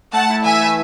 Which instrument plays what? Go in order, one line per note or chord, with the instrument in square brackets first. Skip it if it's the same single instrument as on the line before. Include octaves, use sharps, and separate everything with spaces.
[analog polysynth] A3 [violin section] F#5 A5
[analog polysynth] E4
[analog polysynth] E3 [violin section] E5 G#5
[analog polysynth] A3